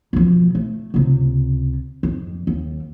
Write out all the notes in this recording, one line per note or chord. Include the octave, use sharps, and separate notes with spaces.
B2 F3
A3
C#2 C3
F2
D#2